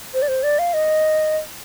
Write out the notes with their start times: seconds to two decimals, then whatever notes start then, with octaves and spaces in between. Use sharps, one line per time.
0.14 C5
0.22 D5
0.28 C5
0.43 D5
0.59 F5
0.74 D#5